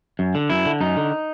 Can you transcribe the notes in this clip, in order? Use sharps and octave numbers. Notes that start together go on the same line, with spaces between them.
F#2
D3
F#2 E4
D3
F#2 D#4
D3